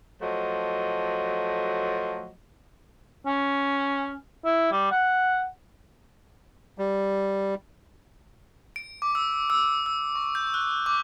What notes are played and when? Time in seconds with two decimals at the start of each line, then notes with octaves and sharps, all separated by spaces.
0.22 F3 F#3 A3 D#5
3.27 C#4
4.45 E4
4.72 G3
4.91 F#5
6.78 G3
8.76 D7
9.02 D6
9.15 E6
9.50 E6
9.86 E6
10.15 C#6
10.35 G6
10.54 F#6
10.86 D6